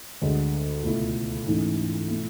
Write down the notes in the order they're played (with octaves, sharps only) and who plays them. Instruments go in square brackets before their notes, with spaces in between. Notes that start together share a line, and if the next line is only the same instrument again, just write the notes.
[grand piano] D2 D3 G#3
C#2 B2 A3 E4
G#2 E3 A3 C#4 E4
B2 A3 E4